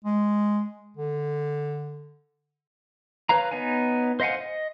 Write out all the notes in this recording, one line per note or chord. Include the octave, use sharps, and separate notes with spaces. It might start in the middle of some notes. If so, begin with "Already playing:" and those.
G#3
D3
B4 C#5 F5 A#5
B3 D#4 C#5 G#5
C5 D#5 F5 F#5 G#5
D#5